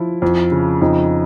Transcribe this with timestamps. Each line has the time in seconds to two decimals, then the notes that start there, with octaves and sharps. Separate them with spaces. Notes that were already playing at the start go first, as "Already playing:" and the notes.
Already playing: F3 E4
0.22 F2
0.52 C#3
0.82 F2 D#4